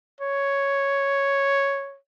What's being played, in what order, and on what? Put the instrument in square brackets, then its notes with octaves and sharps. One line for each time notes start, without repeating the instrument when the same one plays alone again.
[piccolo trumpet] C#5